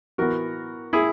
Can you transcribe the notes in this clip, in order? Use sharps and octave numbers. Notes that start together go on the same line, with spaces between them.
E3 B3 F#4 A#4
E4 G#4